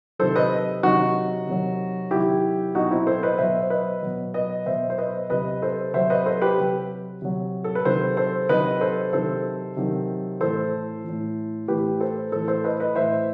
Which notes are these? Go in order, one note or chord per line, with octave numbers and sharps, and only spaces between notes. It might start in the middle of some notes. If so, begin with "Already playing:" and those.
C3 D#3 F#3 A4 C5
B4 D#5
C3 D#3 F#3 D#4 F#4
C3 D#3 F#3
C3 D#3 F#3 E4 G4
B2 F#3 D#4 F#4
C4 E4
A4 C5
B4 D#5
B2 F#3 C5 E5
C5
B4 D#5
B2 F#3
B4 D#5
B2 F#3 C5 E5
C5
B4 D#5
C3 F#3 B4 D#5
A4 C5
C3 F#3 C5 E5
B4 D#5
A4 C5
G4 B4
C3 F#3
C3 F#3
A4
B4
C3 D#3 F#3 A4 C5
A4 C5
C3 D#3 F#3 B4 D#5
A4 C5
C3 D#3 F#3 A4 C5
C3 D#3 F#3
A2 E3 A4 C5
A2 E3
A2 E3 G4 B4
A4 C5
A2 E3 A4 C5
A4 C5
B4 D#5
B4 D#5
A2 E3 C5 E5